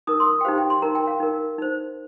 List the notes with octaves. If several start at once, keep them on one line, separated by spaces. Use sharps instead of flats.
D#4 A#4 D#6
C6
D#6
G5
D#4 G4 C5 F5
G5
C6
D#4 A#4 A#5
G5
F5
D#4 A#4
D#4 C5